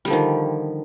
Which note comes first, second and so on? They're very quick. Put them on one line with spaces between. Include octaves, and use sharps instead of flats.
G3 D3 F3 D#3